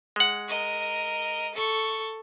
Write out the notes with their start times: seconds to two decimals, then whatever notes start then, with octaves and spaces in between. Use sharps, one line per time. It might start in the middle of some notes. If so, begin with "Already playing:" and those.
0.16 G#3 F#5
0.49 A#4 D#5
1.55 A4 C#6